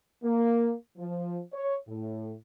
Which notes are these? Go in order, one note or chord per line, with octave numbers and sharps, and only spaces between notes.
A#3
F3
C#5
A2